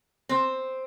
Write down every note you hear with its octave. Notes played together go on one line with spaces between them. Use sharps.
C4